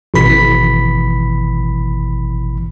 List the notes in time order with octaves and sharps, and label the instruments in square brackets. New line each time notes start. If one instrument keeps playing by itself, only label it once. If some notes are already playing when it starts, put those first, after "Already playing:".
[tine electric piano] G#1 B2 E3 B5 B6